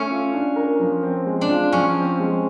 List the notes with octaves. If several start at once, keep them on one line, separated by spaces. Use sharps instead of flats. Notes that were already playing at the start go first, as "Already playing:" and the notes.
Already playing: A3 C#4
F4
D4
A#4
F3
C4
G#3
D4
F4
F3 C#4
C4
G#3